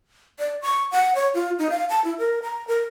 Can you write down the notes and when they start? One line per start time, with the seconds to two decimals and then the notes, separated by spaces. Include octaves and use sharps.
0.39 D5
0.62 C#6
0.92 F#5
1.15 C#5
1.34 F4
1.59 D#4
1.70 F5
1.89 A5
2.04 E4
2.19 A#4
2.42 A#5
2.67 A#4